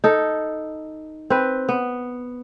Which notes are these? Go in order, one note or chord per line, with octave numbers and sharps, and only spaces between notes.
D#4 A4
C4 B4
B3